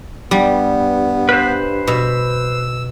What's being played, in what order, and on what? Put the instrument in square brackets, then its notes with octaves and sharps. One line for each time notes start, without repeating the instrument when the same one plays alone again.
[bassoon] G2 [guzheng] G3 [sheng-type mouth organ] B3
[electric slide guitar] B4 C5
[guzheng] B2 [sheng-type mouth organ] E6